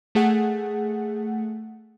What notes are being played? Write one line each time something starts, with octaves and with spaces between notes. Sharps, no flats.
A3 G#4 F#5